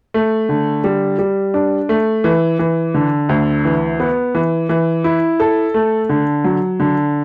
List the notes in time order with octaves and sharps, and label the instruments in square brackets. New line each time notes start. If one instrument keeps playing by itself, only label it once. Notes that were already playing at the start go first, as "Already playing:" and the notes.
[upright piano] A3
D3
G3
G3
D4
A3
E3
E3
D3
D2
E3
B3
E3
E3
E4
A4
A3
D3
F#3
D3